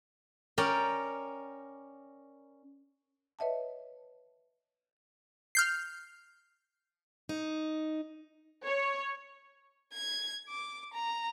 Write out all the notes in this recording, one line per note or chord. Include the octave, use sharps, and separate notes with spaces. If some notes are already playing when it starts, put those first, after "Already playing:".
C#4 A#4 D5 G5
B4 C#5 D#5 E5 F#5 A5
F6 G6 C7
D#4
C#5
G#6
D6
A#5